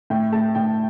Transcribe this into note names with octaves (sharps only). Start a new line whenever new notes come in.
A2 G5
A3 A5
A2 G5